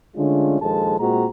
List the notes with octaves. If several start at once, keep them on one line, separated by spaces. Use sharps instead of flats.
D3 G#3 A3 C#4 D4 F4
A#1 D#2 F3 G#3 A4 A5
A#2 G#3 C4 F#4 G#4 A#5